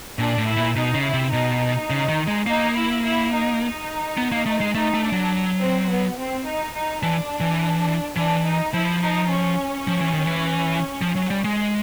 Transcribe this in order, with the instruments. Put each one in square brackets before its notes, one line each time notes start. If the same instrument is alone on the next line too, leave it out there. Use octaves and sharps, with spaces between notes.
[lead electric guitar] A#2 [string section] D4
[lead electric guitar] A2
[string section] E4
[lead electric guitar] A#2
[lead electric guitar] B2 [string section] D#4
[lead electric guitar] C#3
[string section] E4
[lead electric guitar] C3
[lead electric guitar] B2 [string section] D#4
[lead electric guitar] C#3
D#3
G#3
[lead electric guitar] A#3 [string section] D#4
[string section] E4
E4
D#4
D#4
[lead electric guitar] B3
A#3
A3
G#3
[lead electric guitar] A3 [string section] D#4
[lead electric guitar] A3
[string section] D4
[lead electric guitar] F#3
[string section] C4
B3
C4
D#4
D#4
[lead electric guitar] E3 [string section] D4
[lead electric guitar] E3
[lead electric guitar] E3 [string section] D4
[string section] D#4
[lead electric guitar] F3 [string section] E4
[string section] D#4
C#4
[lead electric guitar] F3
E3
D#3
E3
F3
F#3
G3
G#3